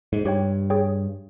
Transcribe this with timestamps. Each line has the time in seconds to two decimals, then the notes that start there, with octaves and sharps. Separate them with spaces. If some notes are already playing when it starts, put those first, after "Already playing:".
0.13 G#2
0.25 G2 G4 C#5 G5
0.70 G#4 C#5 G5